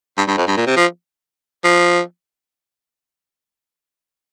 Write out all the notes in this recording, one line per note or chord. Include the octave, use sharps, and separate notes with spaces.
G2
G2
F2
G2
A#2
C3
F3
F3